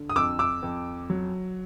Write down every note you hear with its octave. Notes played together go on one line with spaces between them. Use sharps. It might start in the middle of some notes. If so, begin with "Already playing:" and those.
Already playing: D3
D#6
F2 D6 E6
D6 E6
F2
F#3